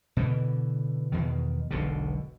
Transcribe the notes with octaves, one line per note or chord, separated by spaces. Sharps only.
B2 D3 E3
E2 B2 D#3
E1 B1 B2 D3